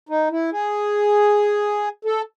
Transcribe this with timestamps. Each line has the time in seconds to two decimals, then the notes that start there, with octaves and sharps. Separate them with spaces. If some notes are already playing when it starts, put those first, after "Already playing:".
0.09 D#4
0.31 E4
0.52 G#4
2.05 A4